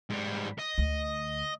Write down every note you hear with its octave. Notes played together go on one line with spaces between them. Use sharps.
G#2 G3
D#5
D2